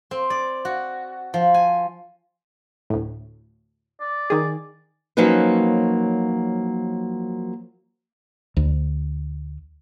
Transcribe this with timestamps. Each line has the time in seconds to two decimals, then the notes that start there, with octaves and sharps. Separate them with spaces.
0.11 C4
0.30 D5
0.65 F#4
1.34 F3
1.54 G#5
2.90 D2 A2
4.01 D5
4.30 D#3 G#4
5.17 F3 F#3 A#3 C#4 D#4 B4
8.57 D2